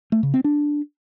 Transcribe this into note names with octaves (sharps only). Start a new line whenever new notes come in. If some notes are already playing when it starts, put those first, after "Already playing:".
A3
C#3
C4
D4